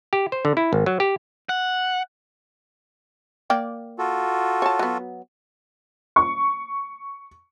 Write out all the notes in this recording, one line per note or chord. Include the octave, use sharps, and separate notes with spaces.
G4
C5
D3
E4
G#1
F#3
G4
F#5
A#3 D5 G5
F4 F#4 A4
C#5 A5
F#3 B3
C#6